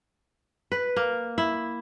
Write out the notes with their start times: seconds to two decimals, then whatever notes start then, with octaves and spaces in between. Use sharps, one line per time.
0.72 B4
0.96 A#3
1.38 E4